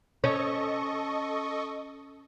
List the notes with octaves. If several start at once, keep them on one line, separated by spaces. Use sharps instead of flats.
C#4 A4 D#5 C#6